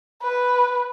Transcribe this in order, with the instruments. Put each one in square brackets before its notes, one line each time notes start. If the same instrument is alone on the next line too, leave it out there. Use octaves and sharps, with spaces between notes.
[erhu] B4